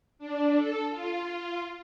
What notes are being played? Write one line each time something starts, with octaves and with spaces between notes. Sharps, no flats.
D4
A4
F4